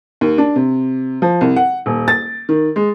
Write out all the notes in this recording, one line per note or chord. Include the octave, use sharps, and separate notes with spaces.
D#2
D4
C3
F3
C2
F#5
D#1
A6
D#3
G#3